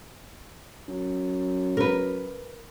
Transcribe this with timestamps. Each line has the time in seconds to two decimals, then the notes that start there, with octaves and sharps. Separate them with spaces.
0.88 F#2
1.77 A#4 B4